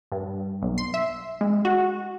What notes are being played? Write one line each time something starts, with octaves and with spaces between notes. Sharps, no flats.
G2
B1
C6
E5
G#3
F#4